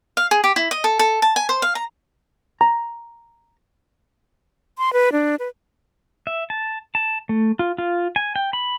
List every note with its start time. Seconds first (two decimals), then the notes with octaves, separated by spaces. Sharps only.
0.17 F5
0.31 G#4
0.44 G4
0.56 E4
0.71 D#5
0.84 A4
0.99 A4
1.22 A5
1.36 G#5
1.49 C5
1.62 F5
1.75 A#5
2.61 A#5
4.78 C6
4.93 B4
5.12 D4
5.39 B4
6.27 E5
6.50 A5
6.95 A5
7.29 A3
7.59 F4
7.78 F4
8.16 G#5
8.36 G5
8.53 B5